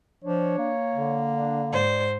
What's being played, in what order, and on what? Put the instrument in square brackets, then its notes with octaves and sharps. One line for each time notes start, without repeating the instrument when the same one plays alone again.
[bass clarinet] F3 [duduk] D4 [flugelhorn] C#5
[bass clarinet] A#3
[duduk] D3
[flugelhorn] D4
[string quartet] G#2 C5 [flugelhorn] D5